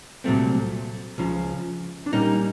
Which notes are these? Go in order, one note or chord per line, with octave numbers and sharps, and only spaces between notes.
C2 A#2 F#3 A3 C4
C#2 C#3 F3
D4
A#2 G3 A#3 C#4 D#4